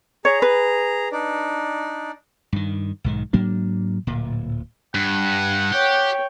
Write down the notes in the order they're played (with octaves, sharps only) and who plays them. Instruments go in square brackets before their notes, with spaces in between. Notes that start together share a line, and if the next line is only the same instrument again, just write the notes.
[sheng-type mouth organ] G#4 A#5 [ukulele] C#5
[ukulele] B4
[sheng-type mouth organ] D4 D#4 D5
[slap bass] G2 D#3
B1 G#2 D#3
G#2 F#3 A#3 D4
D1 A#2
[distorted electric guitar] G2 [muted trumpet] F#5
[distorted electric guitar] G4 [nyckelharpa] C#5 G5